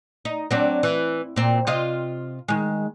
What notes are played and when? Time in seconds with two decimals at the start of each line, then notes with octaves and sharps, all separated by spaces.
0.25 D#4
0.51 F#3 C4 D4
0.83 E3
1.36 A#2 C4
1.67 C3 F4 D#5
2.48 D#3 G#3